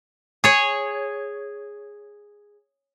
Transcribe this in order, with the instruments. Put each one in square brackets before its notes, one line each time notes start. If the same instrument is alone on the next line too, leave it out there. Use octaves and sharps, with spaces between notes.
[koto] G#4 C#5